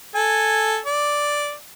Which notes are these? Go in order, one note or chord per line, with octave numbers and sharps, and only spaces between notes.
A4 G#5
D5